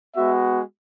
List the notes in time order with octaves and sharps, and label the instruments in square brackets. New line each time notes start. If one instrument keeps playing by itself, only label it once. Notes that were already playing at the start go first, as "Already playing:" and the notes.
[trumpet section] G#3 B3 F#4 E5